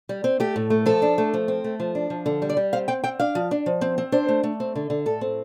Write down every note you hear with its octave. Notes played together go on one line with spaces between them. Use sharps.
G3
C4
A3 G4
A2
A3
F3 A4
D4
A3
F3
C4
A3
F3
D4
F3
D3
G3
D5
G3
C4 F5
C4 G5
C4 G5
D4 F5
F3
D4
F3
C4
C4
D4 C5
A3
A3
C4
D3
D3
A2 A4
C4